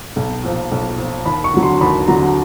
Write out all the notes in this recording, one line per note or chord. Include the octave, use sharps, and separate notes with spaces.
B1
A#2 F3
B1
A#2 F3
D#2 B5
C#6
D3 F#3
C6
D#2 B5
D3 F#3 A#5